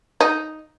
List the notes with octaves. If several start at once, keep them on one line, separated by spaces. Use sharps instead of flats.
D#4